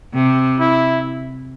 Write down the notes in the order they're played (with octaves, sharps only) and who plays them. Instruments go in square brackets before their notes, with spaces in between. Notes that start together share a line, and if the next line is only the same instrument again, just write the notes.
[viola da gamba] C3
[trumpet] E4